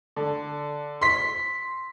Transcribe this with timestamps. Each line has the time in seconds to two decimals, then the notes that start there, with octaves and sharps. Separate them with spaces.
0.16 D3
1.01 C6 B6